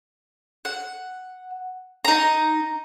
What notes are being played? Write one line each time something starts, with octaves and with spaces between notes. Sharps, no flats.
F#5
D#4 A#5